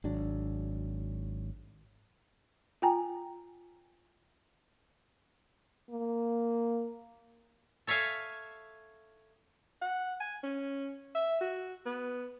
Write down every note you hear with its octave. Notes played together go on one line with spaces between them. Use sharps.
G#1 F#3 D4
F4 G5 G#5 A#5
A#3
A4 C#5 E5 F5 G#5
F#5
G#5
C#4
E5
F#4
B3